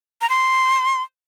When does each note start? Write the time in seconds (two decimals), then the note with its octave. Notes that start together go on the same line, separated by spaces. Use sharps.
0.21 A#5
0.30 C6